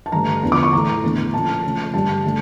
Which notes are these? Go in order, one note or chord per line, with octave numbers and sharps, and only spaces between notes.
A5
G2 D3 A3 A#5
E2 D3 F3
D6
C#6
A2 E3 A3 A#5
E2 D3 A3 D4
A#2 F3 A3 C#4 A5
C#3 F3 A3
G2 D3 G3 A5
D3 A3